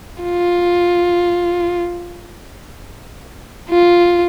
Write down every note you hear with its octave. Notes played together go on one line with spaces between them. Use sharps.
F4
F4